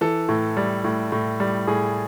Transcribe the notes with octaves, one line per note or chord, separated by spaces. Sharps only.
E3 A4
A2
G3
A2
A2
G3
A2 G#4